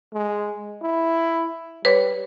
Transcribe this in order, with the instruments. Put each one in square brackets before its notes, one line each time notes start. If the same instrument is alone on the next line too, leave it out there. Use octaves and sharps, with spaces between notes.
[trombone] G#3
E4
[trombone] G3 [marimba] B4 C#5